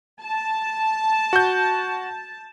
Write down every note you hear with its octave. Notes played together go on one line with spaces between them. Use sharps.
A5
F#4 G6